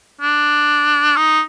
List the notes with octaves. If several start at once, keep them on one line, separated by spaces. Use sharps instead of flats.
D4
D#4